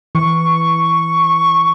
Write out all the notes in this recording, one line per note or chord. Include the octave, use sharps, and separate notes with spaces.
E3 C#6